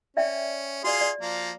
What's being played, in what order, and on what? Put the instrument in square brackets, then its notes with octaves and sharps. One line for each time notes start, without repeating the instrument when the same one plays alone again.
[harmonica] C#4 [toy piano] D5 E5 G5
[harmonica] F4 G#4 C6 [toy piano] F#4 D5
[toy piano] D5
[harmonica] F3 A#3